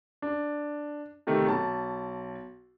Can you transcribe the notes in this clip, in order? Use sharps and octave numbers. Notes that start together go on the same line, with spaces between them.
D4
C3 D#3 A3
B1 A5